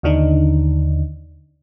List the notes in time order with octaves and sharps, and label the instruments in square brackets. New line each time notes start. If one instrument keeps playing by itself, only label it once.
[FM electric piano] D#2 D3 D4 D#4